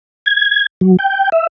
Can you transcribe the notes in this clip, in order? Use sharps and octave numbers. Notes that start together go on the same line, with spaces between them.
G#6
F#3
G5
E5